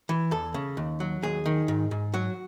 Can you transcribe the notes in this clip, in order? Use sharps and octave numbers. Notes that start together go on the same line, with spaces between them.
E3
E2 A4
C#3
D#2
F#3
D#2 G#4
D#3
G#2
G#2
F#3 F#4